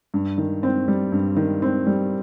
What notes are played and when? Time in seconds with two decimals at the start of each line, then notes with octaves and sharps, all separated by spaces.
0.14 G2
0.38 D#3
0.63 C4
0.88 G3
1.12 G2
1.37 D#3
1.62 C4
1.87 G3